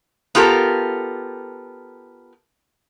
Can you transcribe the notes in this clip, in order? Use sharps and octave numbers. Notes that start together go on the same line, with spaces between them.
B3 F4 G4 A4 A#4